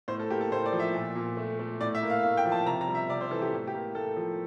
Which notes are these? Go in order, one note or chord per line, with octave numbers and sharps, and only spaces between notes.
A2 C5
A4
A#3 G4
A4
A2 C5
D5
F3
E5
A#2
A#2
A3
A3
A2 D5
E5
A#3
F5
A2 F5
G5
F3
A5
C3 A#5
A#5
G3
E5
C3 D5
C5
E3 A4
G4
A2
G4
A#3
A2 A4
F3